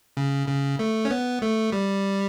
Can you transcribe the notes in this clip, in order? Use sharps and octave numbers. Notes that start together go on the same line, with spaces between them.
C#3
C#3
A3
C#4
B3
A3
G3